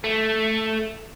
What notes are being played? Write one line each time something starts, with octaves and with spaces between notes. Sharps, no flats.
A3